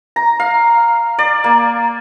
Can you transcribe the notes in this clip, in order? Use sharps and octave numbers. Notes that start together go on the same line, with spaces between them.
A#5
F5
D5
A#3